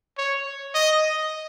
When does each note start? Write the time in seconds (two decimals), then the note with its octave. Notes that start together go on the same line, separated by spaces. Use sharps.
0.17 C#5
0.75 D#5